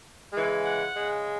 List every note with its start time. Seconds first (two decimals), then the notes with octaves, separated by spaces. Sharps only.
0.33 C#3 E3 G#3
0.65 F#5
0.94 C#3 G#3